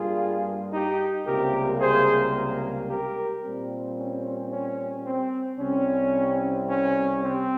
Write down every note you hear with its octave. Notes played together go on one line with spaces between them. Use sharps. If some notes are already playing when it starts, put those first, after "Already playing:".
Already playing: G2 G3 A#3 F4 G#4
D#4 G4
C#2 C3 G3 A#3 G4 A#4
G#4 C5
G4 A#4
A#2 G3 C4
C#4
C#4
C4
C2 C3 G3 C4 C#4
C#4
C4